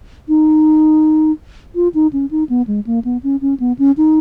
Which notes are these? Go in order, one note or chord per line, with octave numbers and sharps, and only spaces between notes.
D#4
F4
D#4
C#4
D#4
B3
G#3
A#3
B3
C#4
C#4
B3
C#4
D#4